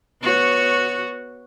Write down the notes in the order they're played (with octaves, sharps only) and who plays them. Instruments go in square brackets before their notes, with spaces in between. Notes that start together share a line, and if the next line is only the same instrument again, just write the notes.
[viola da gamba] B3 F#4 C#5